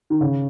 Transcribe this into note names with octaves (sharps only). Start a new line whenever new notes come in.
D#3
C#3